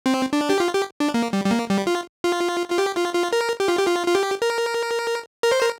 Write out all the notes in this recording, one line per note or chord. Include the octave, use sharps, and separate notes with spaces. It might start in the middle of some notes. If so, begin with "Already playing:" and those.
C4
D4
G4
F4
G4
D4
A#3
G3
G3
A#3
G3
F4
F4
F4
G4
F4
F4
A#4
G4
F4
G4
F4
F4
G4
A#4
A#4
C5
A#4